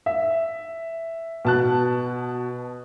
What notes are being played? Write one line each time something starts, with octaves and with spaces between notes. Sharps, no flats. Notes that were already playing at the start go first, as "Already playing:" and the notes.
E5
B2 A5 F#6